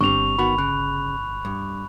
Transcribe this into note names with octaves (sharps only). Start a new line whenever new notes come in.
G1 G3 C4 D4 C#6 F7
D#3 B3 F#4 B5
C#3 F#6
G2